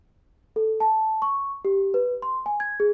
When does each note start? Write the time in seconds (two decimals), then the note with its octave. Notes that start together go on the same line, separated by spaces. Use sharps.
0.56 A4
0.80 A5
1.22 C#6
1.65 G4
1.94 B4
2.22 C6
2.46 G#5
2.60 G#6
2.80 G#4